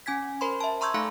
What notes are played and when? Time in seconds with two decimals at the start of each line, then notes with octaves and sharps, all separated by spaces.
0.06 C#4 G#5 G#6 B6
0.41 A#4 C5 B5 C6
0.61 E5 A5
0.81 A#5 C6 C#6 E6 G6 G#6
0.94 A3 D#4 A4 F5 B5 C#7